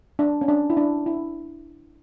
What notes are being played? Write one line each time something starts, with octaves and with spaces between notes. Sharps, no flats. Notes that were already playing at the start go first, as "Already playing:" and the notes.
D4
C#4
D4
E4
D4
E4